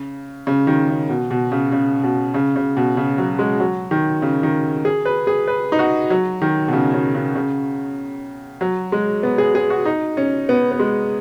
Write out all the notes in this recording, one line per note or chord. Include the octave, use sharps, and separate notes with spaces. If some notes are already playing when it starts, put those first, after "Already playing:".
Already playing: C#3
C#3
D#3
C#3
B2
B2
C#3
C#3
B2
C#3
C#3
B2
C#3
F#3
G#3
F#3
D#3
C#3
D#3
G#4
B4
G#4
B4
D#4
F#4
F#3
D#3
B2
C#3
C#3
C#3
C#3
F#3
G#3
B3
G#4
G#4
F#4
D#4
C#4
B3
B3
G#3